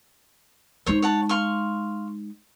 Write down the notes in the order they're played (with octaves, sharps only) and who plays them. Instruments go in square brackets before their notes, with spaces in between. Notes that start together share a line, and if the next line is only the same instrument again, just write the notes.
[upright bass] G#3 D#4 [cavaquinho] C5 C#5
[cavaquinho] C#5 F#5 A5
F5 C6 C#6